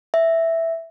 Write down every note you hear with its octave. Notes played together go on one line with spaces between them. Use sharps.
E5